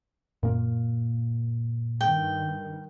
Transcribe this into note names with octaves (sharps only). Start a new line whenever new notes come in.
F#2 A#2 A#3
G2 D#3 G5